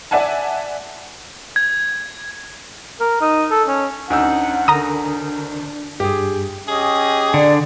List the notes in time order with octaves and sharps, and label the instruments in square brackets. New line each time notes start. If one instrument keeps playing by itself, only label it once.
[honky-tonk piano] D5 E5 F#5 G#5 A5
[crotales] G#6
[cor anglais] A#4
D#4
A4
C#4
[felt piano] D2 D#4 E6 [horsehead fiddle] C#4 F#5
[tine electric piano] D3 A#4 A#6 [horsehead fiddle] D4 [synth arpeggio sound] A#5 D#6
[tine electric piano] G2 [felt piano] G4 G#4
[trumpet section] C#4 G4 D#5 [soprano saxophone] G#4
[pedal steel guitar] D3 [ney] D5